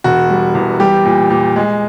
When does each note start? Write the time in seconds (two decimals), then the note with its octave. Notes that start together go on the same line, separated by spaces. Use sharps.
0.04 E1 F#4
0.30 G3
0.55 E2
0.80 G3 G4
1.06 A#2
1.31 A#2
1.56 G#3